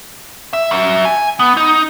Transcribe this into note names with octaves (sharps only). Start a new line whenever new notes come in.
E5
F#3 E5
G#5
B3
D#4